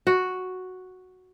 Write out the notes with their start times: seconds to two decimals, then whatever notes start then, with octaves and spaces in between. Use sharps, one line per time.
0.07 F#4